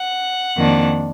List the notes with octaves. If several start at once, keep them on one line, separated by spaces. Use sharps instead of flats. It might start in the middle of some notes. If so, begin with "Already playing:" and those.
Already playing: F#5
F2 D#3 A#3 D4